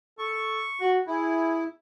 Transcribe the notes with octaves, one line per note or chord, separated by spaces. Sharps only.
A4 C#6
F#4
E4 G#4